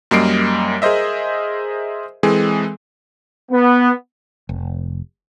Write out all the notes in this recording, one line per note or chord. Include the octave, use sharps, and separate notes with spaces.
F#2 G3 A#3 D#5 C7 D7
G#4 A#4 C5 D#5 E5
E3 G#3 C4 G#4 A4
B3
F1